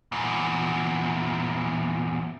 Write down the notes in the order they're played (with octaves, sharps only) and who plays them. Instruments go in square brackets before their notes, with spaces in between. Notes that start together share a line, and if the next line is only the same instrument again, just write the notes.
[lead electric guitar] E2 A#2